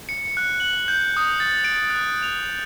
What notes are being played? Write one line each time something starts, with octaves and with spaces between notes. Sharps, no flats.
C#7
F#6
F#7
G6
D#6
A6
D7
F#6
F7